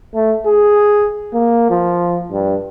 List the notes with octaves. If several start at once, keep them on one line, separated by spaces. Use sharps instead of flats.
A3
G#4
A#3
F3
G2